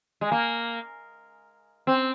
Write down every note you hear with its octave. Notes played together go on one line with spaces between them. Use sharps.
G#3
A#3
C4